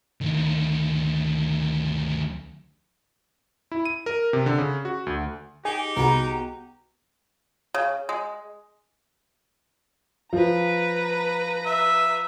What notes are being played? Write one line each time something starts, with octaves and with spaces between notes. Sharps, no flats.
D2 D#3
E4
D#7
A#4
C3
D3
C#3
F#4
D2
D#4 G4 G#4
C2 B3 F#4 G#4 A#5
C#3
G#3
F3 B4 A#5
E5